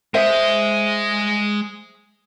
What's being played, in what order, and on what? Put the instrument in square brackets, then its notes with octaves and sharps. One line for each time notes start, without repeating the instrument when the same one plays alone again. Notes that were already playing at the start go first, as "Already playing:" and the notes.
[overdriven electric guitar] G#3 D#5 [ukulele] C5 E5